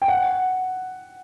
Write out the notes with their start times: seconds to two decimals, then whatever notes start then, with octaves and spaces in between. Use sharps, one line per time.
0.02 G5
0.08 F#5